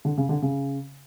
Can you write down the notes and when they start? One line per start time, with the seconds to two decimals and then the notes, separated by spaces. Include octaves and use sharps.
0.05 D3
0.18 C#3
0.29 D3
0.42 C#3